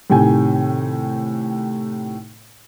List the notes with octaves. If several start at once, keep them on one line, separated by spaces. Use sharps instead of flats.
A2 C3 D#3 G5 G#5